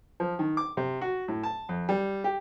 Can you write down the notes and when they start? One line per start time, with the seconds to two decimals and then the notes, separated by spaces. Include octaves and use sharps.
0.20 F3
0.39 D#3
0.57 D6
0.77 C3
1.02 F#4
1.28 A2
1.43 A5
1.69 F2
1.89 G3
2.24 G4